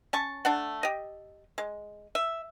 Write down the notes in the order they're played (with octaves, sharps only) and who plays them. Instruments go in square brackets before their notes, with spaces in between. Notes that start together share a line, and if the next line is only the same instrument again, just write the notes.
[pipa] C#4 A5 C#6
A3 D4 F#5
G4 D#5
G#3
E5